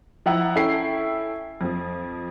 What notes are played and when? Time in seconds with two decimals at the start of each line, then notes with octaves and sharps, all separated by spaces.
0.26 F3 E4 F#5 A#5
0.55 C#4 E4 A4 G5 C7
1.61 F2 F3